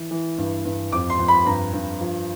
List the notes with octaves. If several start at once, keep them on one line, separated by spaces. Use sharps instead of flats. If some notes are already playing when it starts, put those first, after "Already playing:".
Already playing: E3
E3
G2
G2
F2 D6
C6
F2
B5
G2 A#5
G2
F3